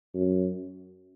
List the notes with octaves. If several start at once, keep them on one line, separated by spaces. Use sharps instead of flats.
F#2